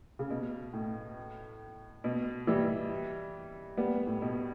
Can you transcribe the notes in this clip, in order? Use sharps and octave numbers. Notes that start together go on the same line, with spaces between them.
C#3
B2
A2
B2
E3 G3
G3 B3
A2
B2